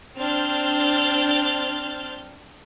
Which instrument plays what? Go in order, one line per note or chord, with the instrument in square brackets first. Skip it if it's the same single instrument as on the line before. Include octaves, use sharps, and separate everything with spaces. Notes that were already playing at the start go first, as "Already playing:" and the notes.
[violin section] C4 D4 F6 G6 A6